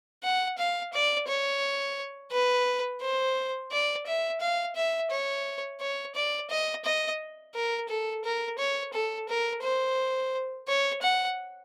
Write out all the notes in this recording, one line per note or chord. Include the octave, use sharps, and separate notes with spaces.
F#5
F5
D5
C#5
B4
C5
D5
E5
F5
E5
C#5
C#5
D5
D#5
D#5
A#4
A4
A#4
C#5
A4
A#4
C5
C#5
F#5